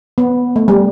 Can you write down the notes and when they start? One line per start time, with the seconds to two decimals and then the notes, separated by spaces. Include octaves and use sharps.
0.18 B3
0.56 A3
0.68 G3